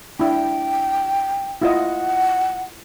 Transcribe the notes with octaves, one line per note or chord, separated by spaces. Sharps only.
D4 E4 G5
E4 F4 D#5 F#5